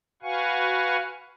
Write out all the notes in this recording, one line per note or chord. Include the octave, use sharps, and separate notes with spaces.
F#4 B4 F5 F#5 G#5 C#6